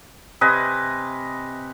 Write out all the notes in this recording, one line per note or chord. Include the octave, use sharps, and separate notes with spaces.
C3 B4 D#5 G#5